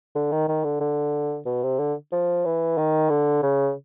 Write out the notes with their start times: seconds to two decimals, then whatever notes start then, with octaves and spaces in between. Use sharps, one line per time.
0.16 D3
0.32 D#3
0.48 D#3
0.64 D3
0.80 D3
1.46 B2
1.63 C3
1.79 D3
2.12 F3
2.45 E3
2.78 D#3
3.10 D3
3.43 C#3